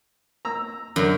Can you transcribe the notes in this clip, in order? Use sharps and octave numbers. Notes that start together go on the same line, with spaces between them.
A#5 E6
F#2 D3